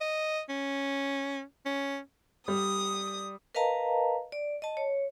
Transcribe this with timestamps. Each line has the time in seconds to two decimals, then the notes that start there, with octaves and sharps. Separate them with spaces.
0.01 D#5
0.49 C#4
1.66 C#4
2.48 G3 D#6
3.55 A#4 B4 D#5 F5 A5 A#5
4.32 D5
4.62 D#5 A5
4.77 C#5